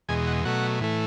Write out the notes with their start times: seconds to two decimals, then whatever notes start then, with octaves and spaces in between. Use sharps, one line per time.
0.09 E2 B2 G#3 G#5
0.27 F#5
0.45 B2 F#3 A3 F#5
0.80 A2 E3 A3